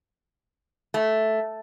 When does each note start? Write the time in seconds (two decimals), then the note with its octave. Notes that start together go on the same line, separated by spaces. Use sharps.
0.94 A3